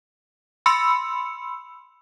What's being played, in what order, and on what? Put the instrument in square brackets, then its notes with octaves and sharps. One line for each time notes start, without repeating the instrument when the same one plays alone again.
[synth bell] B5 C6 E6 C#7